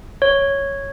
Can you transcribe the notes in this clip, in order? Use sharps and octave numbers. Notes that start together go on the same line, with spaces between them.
C#5